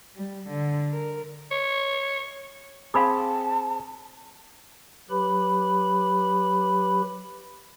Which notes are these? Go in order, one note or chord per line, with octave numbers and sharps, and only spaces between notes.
G3
D3
A#4
C#5
C4 G#4 F5 A5 B5 D6
F#3 G4 B4 B5